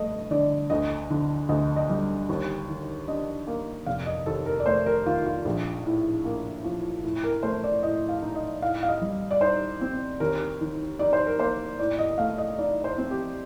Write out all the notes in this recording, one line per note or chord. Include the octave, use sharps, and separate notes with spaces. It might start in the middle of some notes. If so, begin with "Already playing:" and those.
Already playing: G2 A3 D#5
D3 D5
D2 D#5
D3
D2 D#5
D#5
G3
D#2
D#3
D4 D#5
A#3
F1 F5
D#5
D#2 A4
A#4
D5
A3 C5
A#4
D#3 F4
F4
A#1
A2
A#3
F3
A2
A#4
A3 C5
D5
A2 D#5
F5
D#4
D#5
A2 F5
F5
D#5
G3
D5
D#4 C5
C4
D#2 A#4
D#3
D#4 D5
C5
A#4
A#3 C5
A2 D5
D#5
A3 F5
D#5
D#4 D5
C5
C4
G4